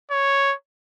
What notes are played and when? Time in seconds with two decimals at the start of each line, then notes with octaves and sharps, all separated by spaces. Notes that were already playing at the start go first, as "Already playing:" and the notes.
0.11 C#5